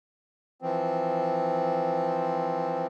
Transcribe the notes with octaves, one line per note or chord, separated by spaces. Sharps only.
E3 F3 C4